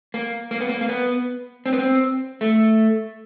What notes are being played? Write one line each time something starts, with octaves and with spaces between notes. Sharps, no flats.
A#3
A#3
B3
A#3
A#3
B3
C4
B3
C4
A3